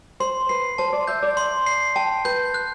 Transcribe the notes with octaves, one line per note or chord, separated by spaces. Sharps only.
C5 C6
B4 C7
C5 A5
D5
E5 G6
D5
C6
C7
G5 A5
B4 G6
F#6